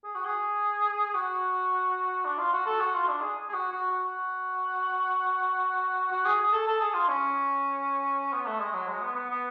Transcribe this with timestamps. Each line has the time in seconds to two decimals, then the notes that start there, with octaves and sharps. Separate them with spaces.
0.04 G#4
0.15 F#4
0.25 G#4
1.14 F#4
2.25 D4
2.39 F4
2.53 F#4
2.66 A4
2.80 F#4
2.94 F4
3.08 D4
3.21 G#4
3.49 G#4
3.54 F#4
3.72 F#4
3.91 F#4
6.12 F#4
6.25 G#4
6.40 G#4
6.52 A4
6.67 A4
6.80 G#4
6.94 F4
7.09 C#4
8.33 B3
8.46 A3
8.60 G#3
8.73 F#3
8.87 G#3
9.02 B3
9.16 B3
9.30 B3